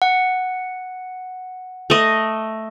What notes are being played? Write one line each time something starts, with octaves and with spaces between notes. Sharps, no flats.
F#5
A3 D#5